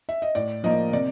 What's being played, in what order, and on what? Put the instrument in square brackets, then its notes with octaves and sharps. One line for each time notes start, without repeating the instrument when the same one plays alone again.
[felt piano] E5
D#5
A2 D5
F3 A#3 D#5
C3 D5